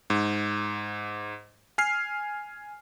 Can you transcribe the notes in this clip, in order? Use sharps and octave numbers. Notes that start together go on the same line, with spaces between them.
G#2
G#5 F6 C7